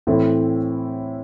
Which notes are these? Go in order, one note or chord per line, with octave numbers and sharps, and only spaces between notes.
A2 E3 A3 C4 E4